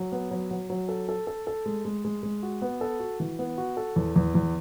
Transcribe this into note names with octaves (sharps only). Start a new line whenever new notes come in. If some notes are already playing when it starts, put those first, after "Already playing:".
Already playing: F#3
B3
F#3
F#3
F#3
A4
A4
A4
A4
G#3
G#3
G#3
G#3
F#4
B3
A4
F#4
E3
B3
F#4
A4
E2
E2
E2